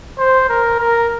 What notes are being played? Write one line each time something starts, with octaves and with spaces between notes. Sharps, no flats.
C5
A#4
A#4